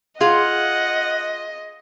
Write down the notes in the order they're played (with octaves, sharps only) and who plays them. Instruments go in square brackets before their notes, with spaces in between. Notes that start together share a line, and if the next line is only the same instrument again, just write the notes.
[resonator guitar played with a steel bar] F4 [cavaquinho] G#4 F5 [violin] D#5 [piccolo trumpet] F#5